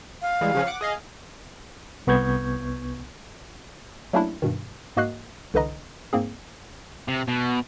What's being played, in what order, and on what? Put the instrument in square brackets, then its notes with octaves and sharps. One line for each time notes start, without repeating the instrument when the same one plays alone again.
[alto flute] F5
[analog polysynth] E3 G3 G#3
C#3 F3 C#4
F#5 D6
G#4 D#5 F5
[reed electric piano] C2 B3 C#6 G6 G#6
[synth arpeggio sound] F#3 A3 A#3 C#4 D4 E4
G2 B2 D#3
G#2 A#3 F#4 D#5 F#6 C7
C2 D3 E3 B4 D#5 A#5
G#2 A#3 C4 G#4
[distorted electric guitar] C3
B2